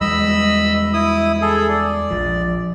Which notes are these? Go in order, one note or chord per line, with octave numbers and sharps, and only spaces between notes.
E2 G3 G#3 D#5 B5 E6
E4 D#6
G#4 A4
D5
A#1 F3